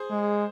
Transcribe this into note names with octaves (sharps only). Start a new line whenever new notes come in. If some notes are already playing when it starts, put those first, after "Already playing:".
Already playing: G#4 C5
G#3